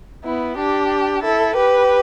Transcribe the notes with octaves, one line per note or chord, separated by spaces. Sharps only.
B3 E4
D4 G4
E4 A4
G4 B4